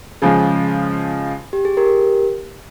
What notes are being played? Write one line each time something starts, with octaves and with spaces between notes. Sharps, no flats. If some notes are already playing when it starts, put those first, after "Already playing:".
C#3 F3 G#3 G#4
G4
G#4
G4 A#4